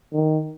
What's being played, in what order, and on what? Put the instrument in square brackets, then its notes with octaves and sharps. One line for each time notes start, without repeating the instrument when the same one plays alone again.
[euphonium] D#3